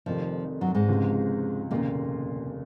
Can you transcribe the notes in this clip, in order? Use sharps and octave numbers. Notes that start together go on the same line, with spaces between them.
F1 F2 C3 D#3 F3
F#2 F#3
G#2 G#3
C#2 C3 F3
F1 D#2 A#2 C#3 A#3